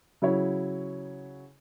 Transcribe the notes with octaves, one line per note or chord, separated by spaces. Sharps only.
C#3 F#3 E4 C#5